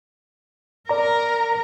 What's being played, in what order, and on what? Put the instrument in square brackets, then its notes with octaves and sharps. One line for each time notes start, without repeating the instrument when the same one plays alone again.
[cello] A#4 [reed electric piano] D5 A#5